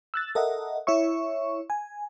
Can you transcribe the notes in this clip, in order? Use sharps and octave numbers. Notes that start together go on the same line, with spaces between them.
E6 F#6 A6
A4 A#4 D#5 E5 F#5
E4 C#5 E5 C#6
G#5